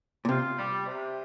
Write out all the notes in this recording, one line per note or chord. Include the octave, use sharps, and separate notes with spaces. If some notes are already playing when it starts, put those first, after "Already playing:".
A#2
C3 F4
G3
C3